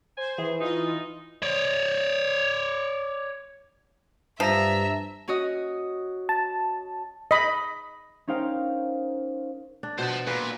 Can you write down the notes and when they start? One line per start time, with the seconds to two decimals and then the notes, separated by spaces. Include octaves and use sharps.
0.17 C5 G#5
0.38 E3 G#4
0.60 D#4 F4 D#5
1.42 C#5 D5
4.40 G2 F3 E5 A5 A#5 A#6
5.28 C#4 F#4 D#5
6.29 A5
7.31 D#5 B5
8.27 C#4 D#4 A#4 C5 F5 G5
9.83 D4
9.99 B2 C5 A5
10.27 A#2 B4